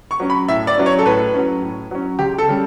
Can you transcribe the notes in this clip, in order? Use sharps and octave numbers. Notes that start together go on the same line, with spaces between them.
C#6
F#3 C#4
B5
A2 E5
D5
F#3 C#4
C#5
A4
A2 B4
F#3 C#4
A2
F#3 C#4
C#2 G4
A4
C#3 G3